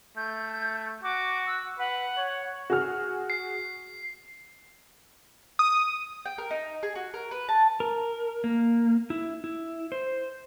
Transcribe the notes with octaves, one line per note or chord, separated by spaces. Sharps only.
A3 G6
F#4 D6
E6
B4 F#5
C#5
F#4 G#4 F6
C7
D#6
G5
A#4
D#4
G#4
F#4
A#4
B4
A5
A#4
A#3
E4
E4
C5